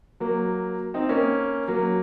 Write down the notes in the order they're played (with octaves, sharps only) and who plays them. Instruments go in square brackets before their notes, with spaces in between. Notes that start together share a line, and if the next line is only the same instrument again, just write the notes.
[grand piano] F#3 A#3
C4 D#4
A#3 C#4
F#3 A#3